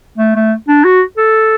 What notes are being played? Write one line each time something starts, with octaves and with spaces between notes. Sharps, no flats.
A3
A3
D4
F#4
A4